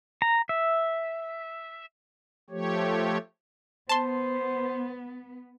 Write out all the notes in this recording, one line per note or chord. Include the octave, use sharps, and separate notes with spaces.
A#5
E5
F3 A3 G4 C#5
B3 C5 A5 C6